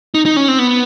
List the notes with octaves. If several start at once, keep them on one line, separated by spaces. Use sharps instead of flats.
D#4
D#4
C#4
C4
B3